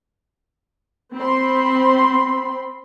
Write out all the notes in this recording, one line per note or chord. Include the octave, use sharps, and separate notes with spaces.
C4 B5 C6